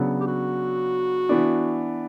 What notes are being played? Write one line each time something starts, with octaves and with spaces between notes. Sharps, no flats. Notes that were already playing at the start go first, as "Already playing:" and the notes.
Already playing: C#3 F#3 B3 D4
G4
F#4
E3 B3 D4